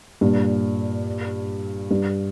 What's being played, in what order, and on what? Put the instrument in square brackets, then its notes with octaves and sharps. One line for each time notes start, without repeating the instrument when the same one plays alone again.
[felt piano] G2 A#2
G2